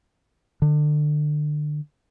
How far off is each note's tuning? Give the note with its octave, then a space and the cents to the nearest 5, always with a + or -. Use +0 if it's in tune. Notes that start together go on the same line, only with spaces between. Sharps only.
D3 +30